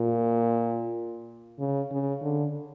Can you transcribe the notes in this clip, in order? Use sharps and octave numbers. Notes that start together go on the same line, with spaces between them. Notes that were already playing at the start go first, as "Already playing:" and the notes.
Already playing: A#2
C#3
C#3
D3